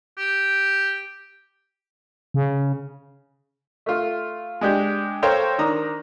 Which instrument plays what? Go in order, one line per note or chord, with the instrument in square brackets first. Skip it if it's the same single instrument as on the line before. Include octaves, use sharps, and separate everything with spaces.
[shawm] G4
[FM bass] C#3
[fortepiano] A3 F4
G#3 D4 G4
A4 C5 C#5 F5 G5 A#5
D#3 D4 A#5 D#6